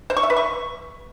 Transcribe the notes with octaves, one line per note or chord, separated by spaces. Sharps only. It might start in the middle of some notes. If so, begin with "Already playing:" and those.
C5
C#6
E5
B4
C#6